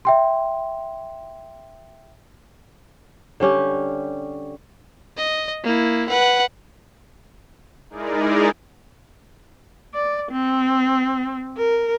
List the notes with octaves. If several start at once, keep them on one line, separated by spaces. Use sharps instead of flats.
E5 G5 C6
D3 G3 C#4 G4
D#5
A#3 E4
B4 F#5
G#3 D#4 E4 G#4 A#4 D5
D5
C4
A#4